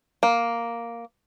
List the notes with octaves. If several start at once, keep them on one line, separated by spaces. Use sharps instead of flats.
A#3